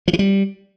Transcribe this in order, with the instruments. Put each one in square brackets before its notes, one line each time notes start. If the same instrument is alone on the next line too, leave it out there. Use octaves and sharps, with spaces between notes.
[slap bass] F3
E3
G3